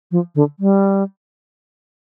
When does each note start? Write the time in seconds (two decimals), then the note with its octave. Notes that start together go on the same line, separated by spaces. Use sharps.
0.11 F3
0.35 D3
0.59 G3